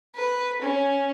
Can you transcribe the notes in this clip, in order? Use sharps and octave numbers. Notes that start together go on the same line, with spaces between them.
B4
C#4